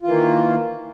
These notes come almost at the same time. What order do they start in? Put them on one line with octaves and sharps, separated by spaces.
F4 E3 A#3 D#3